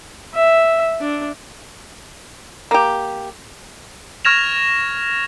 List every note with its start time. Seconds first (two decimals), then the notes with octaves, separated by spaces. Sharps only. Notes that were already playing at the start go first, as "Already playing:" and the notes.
0.34 E5
1.01 D4
2.71 A#3 G4
4.25 C#6 F6 G#6 A#6 E7 F7